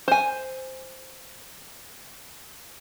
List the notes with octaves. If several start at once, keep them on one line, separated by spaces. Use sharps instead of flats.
C5 G#5